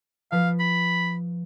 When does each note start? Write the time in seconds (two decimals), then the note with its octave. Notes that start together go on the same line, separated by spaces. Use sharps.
0.32 F3 B4 F5
0.60 B5